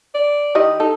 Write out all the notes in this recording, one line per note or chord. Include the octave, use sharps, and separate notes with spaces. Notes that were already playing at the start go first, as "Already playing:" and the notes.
D5
D#3 E4 G4 D#5
D#4 A4